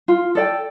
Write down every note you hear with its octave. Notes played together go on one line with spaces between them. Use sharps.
F4
A4 D5 G5